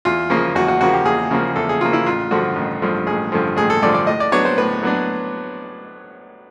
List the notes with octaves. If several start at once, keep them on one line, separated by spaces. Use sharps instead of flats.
E2 F4
C#3 F3 A#3
E2 F#4
F#4
C#3 F3 A#3 F#4
G4
E2 G#4
C#3 F3 A#3
E2 A4
G#4
C#3 F3 A#3 F4
E4
A1 F4
G2 D3 F3 F#4
A1
G2 D3 F3
A1 G#4
G2 D3 F3
A1 G#4
A4
G2 D3 F3 D5
D5
A2 D#5
D5
F#3 B3 D4 C#5
C5
A2 B4
F#3 B3 D4